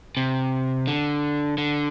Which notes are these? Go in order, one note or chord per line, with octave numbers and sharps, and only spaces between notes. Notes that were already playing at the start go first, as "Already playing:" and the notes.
C3
D3
D3